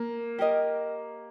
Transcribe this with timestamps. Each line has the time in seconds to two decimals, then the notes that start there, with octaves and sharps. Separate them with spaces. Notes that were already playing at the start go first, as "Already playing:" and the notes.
Already playing: A#3
0.39 G4 A#4 D#5